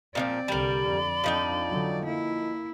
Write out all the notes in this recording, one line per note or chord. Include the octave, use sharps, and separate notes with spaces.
A#2 D#3 F3 C4 D5
C2 D3 G3 A#4 B5
F2
F2 F3 D4 D#4 G5
D3 F#3
A#3 E4